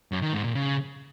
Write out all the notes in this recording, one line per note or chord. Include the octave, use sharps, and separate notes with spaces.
F#2
D#3
G#2
A#2
C#3